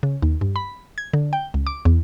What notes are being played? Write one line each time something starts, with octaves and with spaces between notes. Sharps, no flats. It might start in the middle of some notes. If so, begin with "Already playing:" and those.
C#3
D#2
G2
B5
G#6
D3
G5
C#2
D6
E2